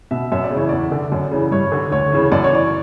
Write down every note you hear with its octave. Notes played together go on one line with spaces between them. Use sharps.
B2 E5
F#2 E5
D5
C#3
E3 C#5
E2 D5
D3
F#2
C#3 E3
G2 C#5
D3
D2 C#5
C#3 E3
F#2 D5
C#5
E3 D5